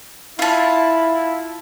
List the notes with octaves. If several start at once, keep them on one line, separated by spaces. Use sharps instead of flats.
E4 F4 A5